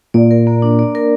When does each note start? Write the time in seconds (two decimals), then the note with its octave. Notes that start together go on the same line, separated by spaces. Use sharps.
0.14 A#2 D5
0.31 A#4
0.47 A#3
0.62 D4
0.79 D5
0.95 A#4